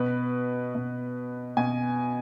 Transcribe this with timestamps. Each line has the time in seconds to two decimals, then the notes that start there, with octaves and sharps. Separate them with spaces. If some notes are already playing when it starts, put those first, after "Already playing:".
Already playing: B2 B4
0.75 B2
1.57 B2 G#5